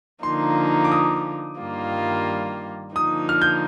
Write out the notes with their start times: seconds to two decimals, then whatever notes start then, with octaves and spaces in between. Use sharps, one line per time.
0.23 D3 F3 A#3 D#4 C6
0.84 D6
0.91 D#6
1.59 G2 D#3 G3 A#3 F4
2.95 D3 F3 A#3 D#4 D#6
3.29 F6
3.42 G6